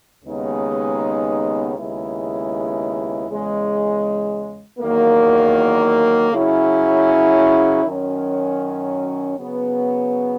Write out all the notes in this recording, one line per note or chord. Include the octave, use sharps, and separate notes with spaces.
D#2 C#3 G#3 B3 D#4
D#2 C#3 G#3 B3 E4
E2 C#3 G#3
E2 D#3 F#3 A#3
C#3 F#3 C#4 E4
F#2 D#3 F#3 C#4
C#3 F#3 B3